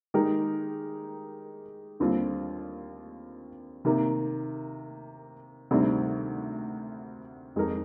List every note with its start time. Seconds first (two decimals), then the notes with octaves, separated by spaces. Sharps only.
0.14 D#3 G#3 D#4 G4 A#4
2.00 D#2 D3 G3 C4 F4
3.85 C3 D#3 A#3
5.71 D2 C3 D#3 G3 C4
7.56 F2 D#3 G#3 D#4 A#4